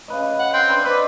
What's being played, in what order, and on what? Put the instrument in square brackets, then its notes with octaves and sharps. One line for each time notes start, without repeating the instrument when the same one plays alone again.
[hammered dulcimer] C#3 B4 D#5
[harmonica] F#5
G5 C6
[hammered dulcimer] D4 A4 B4
[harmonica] B4 [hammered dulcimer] C5 D5 D#5